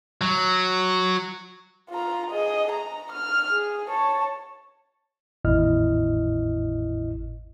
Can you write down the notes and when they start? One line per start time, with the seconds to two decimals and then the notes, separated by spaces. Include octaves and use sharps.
0.21 F#3
1.90 F4 A#5
2.31 G#4 D#5
2.72 A#5
3.12 F6
3.50 G#4
3.90 C#5 A5
5.45 G#1 E2 A2 E4 D#5 F6